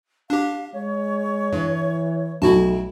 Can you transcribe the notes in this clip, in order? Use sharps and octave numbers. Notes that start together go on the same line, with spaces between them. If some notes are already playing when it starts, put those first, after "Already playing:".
D4 G4 F5
G#3 C#5
G2 E3
B1 A3 E4 F#4 A5